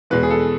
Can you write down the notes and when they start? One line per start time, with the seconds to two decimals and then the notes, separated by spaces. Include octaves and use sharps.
0.10 E2 B2 G#3 B4
0.23 G#4
0.30 A4